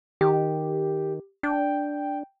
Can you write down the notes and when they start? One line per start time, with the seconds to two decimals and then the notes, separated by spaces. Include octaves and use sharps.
0.21 D#3 G4
1.43 D4 G5